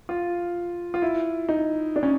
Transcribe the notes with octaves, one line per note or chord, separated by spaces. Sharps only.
F4
F4
E4
D#4
D4
C#4